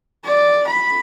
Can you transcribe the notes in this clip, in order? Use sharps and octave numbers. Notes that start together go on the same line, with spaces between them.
D5
B5